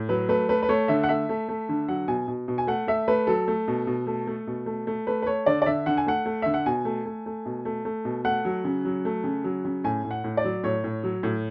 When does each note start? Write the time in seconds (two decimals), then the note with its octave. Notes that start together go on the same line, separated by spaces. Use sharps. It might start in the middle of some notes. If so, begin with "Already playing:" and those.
Already playing: A2
0.09 F#3 B4
0.29 A3 B4
0.49 A3 B4
0.62 B4
0.69 A3 C#5
0.88 D3 E5
1.03 F#5
1.09 A3 E5
1.29 A3
1.49 A3
1.69 D3
1.88 F#3 F#5
2.08 B2 G#5
2.28 B2
2.48 B2
2.58 G#5
2.67 A3 F#5
2.87 A3 E5
3.08 A3 B4
3.27 F#3 A4
3.48 A3
3.68 B2
3.87 B2
4.07 A3
4.27 A3
4.47 B2
4.66 A3
4.87 A3
5.07 A3 B4
5.22 B4
5.26 A3 C#5
5.46 D3 D5
5.62 D5
5.66 D3 E5
5.86 D3 F#5
5.97 G#5
6.06 A3 F#5
6.26 A3
6.42 D3 E5
6.54 F#5
6.66 B2 G#5
6.85 A3
7.06 A3
7.26 A3
7.46 B2
7.65 A3
7.85 A3
8.05 B2
8.24 A3 F#5
8.45 F#3
8.65 C#3
8.85 F#3
9.05 A3
9.24 C#3
9.44 F#3
9.65 C#3
9.84 A2 G#5
10.04 A2
10.11 F#5
10.24 A2
10.37 D5
10.44 F#3
10.64 A2 C#5
10.84 A2
11.03 F#3
11.23 A2